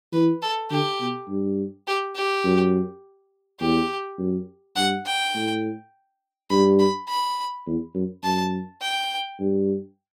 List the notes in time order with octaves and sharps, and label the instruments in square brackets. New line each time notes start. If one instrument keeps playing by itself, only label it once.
[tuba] E3 [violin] B4
[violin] A4
[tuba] D3 [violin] G4
[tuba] B2
G2
[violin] G4
G4
[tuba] F#2
[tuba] E2 [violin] G4
[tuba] F#2
[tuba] G2 [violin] F#5
[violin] G5
[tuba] A2
[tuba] G2 [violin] B5
[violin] B5
B5
[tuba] E2
F#2
[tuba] F#2 [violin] A5
[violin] G5
[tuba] G2